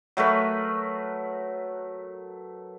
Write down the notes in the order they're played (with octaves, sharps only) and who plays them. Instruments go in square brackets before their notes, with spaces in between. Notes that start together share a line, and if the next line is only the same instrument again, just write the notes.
[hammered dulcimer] F#3 A3 A#4 B4